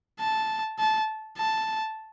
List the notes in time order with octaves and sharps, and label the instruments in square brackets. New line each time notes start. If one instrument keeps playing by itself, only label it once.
[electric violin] A5
A5
A5